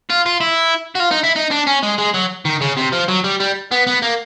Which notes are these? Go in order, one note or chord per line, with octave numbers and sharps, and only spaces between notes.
F4
F4
E4
F#4
F4
D#4
E4
D#4
D4
C#4
G#3
G#3
F#3
D#3
C#3
C3
F3
F#3
G3
G3
B3
B3
A#3